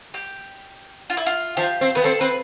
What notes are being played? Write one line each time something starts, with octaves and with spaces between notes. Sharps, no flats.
G4
F4
E4
F4
F3 G4
C4
B3 B4
C4 A4
C4 B4